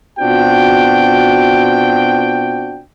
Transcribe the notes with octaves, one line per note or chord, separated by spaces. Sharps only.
B2 C4 D4 F4 F#4 G5